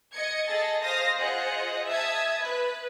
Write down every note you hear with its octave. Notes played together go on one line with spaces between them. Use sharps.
D#5 G#6 C#7
G#4 A4 D#5 A6
C5 F5 D#6 A#6
F4 G#4 C5 D#5 F#5
E5 A5 D#6 G#6
B4